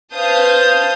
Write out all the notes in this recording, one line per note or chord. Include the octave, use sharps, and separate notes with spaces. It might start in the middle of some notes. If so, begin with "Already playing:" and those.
B4 C5 F5 A5 D#6 G6